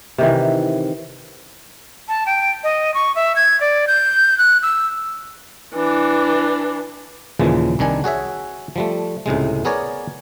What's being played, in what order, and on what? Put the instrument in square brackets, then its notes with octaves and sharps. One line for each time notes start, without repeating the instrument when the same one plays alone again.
[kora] C3 D#3 E3
[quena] A5
G5
D#5
C#6
E5
G#6
D5
G6
F#6
E6
[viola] E3 D4
[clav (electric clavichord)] D#2 A#2 C#3 E3 F3 G#3
C2 D#3 D4 G#5
F#4 G#4 C#5 E5
F3 G3 A3
C#2 A2 C3 G#3
B3 G#4 A#4 C#5 D5